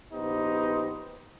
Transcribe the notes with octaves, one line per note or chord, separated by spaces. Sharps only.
A#1 B3 D#4 G4 B4 C5